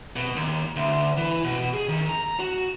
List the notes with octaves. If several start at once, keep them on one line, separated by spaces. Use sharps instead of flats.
B2
D#2
D2
E3
B2
G#4
D#3
A#5
F#4